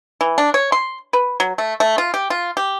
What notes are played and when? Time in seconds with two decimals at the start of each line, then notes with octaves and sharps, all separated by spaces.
0.21 E3
0.38 D4
0.54 C#5
0.72 C6
1.13 B4
1.40 F#3
1.58 A3
1.80 A3
1.98 F4
2.14 G4
2.30 F4
2.57 G4